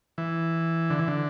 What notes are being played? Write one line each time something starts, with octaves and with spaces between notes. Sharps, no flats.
E3
D3
E3
D3